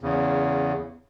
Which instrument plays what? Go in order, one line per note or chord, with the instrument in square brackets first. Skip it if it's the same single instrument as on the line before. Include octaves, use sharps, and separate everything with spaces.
[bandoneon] E2 C#3